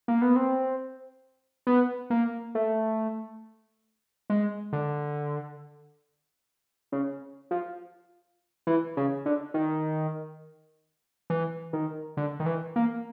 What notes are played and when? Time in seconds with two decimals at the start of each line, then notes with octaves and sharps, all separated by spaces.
0.08 A#3
0.22 B3
0.36 C4
1.67 B3
2.10 A#3
2.55 A3
4.30 G#3
4.73 D3
6.92 C#3
7.51 F3
8.67 E3
8.97 C#3
9.26 D3
9.54 D#3
11.30 E3
11.73 D#3
12.17 D3
12.40 D#3
12.46 E3
12.76 A#3